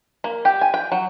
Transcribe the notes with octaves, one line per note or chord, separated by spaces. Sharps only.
A#3
G4
G#5
G5
F#3